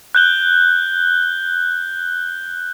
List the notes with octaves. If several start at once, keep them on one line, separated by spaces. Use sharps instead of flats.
F#6 G6 G7